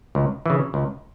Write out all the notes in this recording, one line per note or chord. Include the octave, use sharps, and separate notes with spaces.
C#2
C#3 E3
C#2